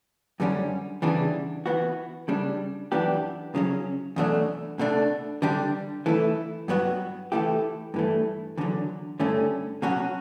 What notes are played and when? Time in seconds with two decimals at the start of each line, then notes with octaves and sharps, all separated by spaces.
0.40 F#2 D3 G3 C#4
1.02 E2 C#3 E3 G3 D4
1.66 E3 B3 F#4
2.28 C#3 G3 D4
2.92 F#2 E3 B3 D4 G4
3.55 C#3 F#3 C#4
4.16 E2 B2 F#3 A3 D4
4.79 B2 A3 D4
5.42 D3 G3 D4 G4
6.06 E3 A3 E4
6.68 G2 F#3 B3 F#4
7.32 E3 A3 E4 G4
7.94 G2 E3 A3
8.57 E2 D3 F#3
9.20 G2 D3 A3 C#4
9.82 B2 F#3 C#4 F#4